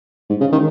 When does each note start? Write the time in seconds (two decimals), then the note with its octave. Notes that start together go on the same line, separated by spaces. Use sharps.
0.30 G#2
0.41 C#3
0.52 D#3